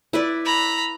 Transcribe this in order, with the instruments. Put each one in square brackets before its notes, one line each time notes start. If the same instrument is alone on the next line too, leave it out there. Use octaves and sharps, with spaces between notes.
[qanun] E4 B4 D5
[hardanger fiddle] A#5 B5